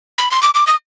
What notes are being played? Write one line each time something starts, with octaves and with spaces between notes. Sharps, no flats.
B5
C6
D6
D6
D#6